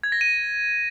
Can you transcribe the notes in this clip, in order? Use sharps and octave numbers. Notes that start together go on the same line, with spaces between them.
G#6
A#6
D#7